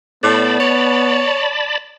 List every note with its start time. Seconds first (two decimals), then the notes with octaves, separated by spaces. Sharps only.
0.23 A2 B3 D5 A5 B5
0.60 C#5